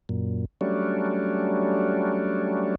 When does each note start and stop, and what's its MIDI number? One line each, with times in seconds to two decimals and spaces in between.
0.09 0.45 42
0.09 0.45 46
0.61 2.75 54
0.61 2.75 55
0.61 2.75 57
0.61 2.75 61
0.61 2.75 62